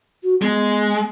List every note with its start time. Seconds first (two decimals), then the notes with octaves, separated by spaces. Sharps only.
0.23 F#4
0.42 G#3 B3